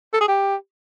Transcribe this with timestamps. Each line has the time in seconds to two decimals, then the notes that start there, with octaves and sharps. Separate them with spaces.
0.14 A4
0.21 G#4
0.28 G4